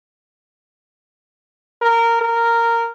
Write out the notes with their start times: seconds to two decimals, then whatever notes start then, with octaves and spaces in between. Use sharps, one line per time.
1.82 A#4
2.21 A#4